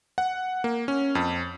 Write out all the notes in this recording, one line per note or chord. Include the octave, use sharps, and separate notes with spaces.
F#5
A#3
C#4
F2